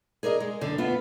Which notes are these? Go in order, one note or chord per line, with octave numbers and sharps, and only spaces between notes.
G#4 A#4 D5 D#5
G#3
F#2 D3
B3 F4 E5